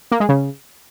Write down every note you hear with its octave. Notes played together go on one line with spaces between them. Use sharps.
A#3
G#3
C#3